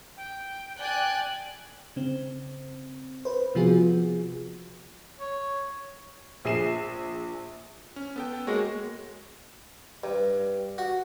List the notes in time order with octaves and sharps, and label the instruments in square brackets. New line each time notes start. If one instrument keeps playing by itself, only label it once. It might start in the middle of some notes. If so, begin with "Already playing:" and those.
[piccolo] G5
[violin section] D5 G5 F#6 [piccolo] G#5
[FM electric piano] C#3 C4
B4 C5
C3 F3 B3 F4 F#4 G#4
[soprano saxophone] C#5
[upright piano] A#1 G#4 C7 E7
[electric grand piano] C#4
B3 A4 G5
[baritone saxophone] G#3 [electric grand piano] A#3 F#4 C#5
[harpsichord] G2
F#4